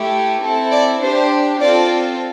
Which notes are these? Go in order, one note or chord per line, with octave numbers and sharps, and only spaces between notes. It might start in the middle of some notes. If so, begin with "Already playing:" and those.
Already playing: A3 E4 G4
C4 E4 A4
D5
D4 G4 C5
C4 F4 A4 D5